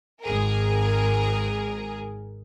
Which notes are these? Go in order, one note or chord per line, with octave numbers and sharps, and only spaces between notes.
G#1 G#4 A#4